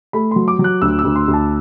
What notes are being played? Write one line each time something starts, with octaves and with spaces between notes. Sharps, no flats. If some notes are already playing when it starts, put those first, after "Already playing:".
A3 B5
F#3 C6
D6
F#3
F#6
D2 E6
E6
D2
C6
D2
A5